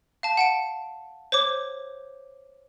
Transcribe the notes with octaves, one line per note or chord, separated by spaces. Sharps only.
F5 A5
F#5 A5 D7
C5 C#5 D6